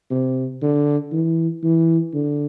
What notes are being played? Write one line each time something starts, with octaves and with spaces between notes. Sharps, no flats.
C3
D3
E3
E3
D3